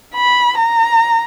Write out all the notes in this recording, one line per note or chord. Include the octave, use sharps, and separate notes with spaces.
B5
A#5